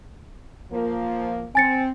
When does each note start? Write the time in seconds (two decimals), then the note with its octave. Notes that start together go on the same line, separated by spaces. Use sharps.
0.72 F3 A#3
1.55 C4 G#5 A6 C#7